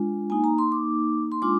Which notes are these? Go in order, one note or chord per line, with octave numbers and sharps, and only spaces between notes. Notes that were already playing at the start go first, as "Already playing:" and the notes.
Already playing: G#3 D4 F4
A#3 D#4 G#5
A#5
C6
D6
C6
G#3 D4 F4 D6